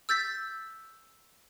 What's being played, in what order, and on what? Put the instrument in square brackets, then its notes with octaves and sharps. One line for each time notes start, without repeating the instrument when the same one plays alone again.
[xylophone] E6 G6 A6 B6